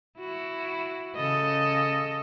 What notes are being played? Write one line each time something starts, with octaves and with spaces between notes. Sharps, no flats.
E4 F#4
C#3 A4 D#5